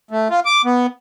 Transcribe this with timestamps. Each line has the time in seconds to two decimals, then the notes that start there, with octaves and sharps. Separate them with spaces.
0.11 A3
0.30 F4
0.45 D6
0.65 B3